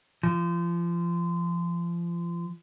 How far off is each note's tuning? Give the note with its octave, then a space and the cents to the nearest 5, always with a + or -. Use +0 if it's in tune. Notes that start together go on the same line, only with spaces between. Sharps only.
F3 -30